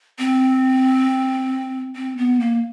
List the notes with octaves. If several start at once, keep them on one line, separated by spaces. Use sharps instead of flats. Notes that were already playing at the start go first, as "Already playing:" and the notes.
C4
C4
B3
A#3